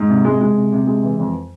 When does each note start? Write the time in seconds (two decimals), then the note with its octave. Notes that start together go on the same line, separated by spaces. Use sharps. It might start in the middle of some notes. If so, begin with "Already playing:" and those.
Already playing: G#2
0.09 C3
0.25 G#3
0.41 G#3
0.56 C3
0.72 C3
0.87 G#3
1.03 E3
1.19 F2